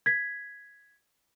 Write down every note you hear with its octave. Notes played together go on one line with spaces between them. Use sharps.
G#6 B6